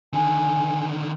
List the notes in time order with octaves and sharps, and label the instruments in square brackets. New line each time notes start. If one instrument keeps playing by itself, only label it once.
[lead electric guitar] D3 D#3 [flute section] G#5